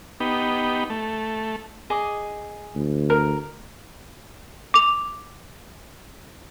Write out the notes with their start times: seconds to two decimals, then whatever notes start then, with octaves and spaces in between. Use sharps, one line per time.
0.20 B3 D#4 G4
0.90 A3
1.90 G#4 D#5 D6
2.75 D2
3.10 A#4
4.74 D6 F7